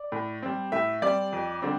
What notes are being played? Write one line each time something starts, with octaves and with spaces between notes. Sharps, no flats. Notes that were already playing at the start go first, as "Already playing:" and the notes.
Already playing: D5
A2
G3 C4
A2 E5
G3 C4 D5
F2
D3 G3 C4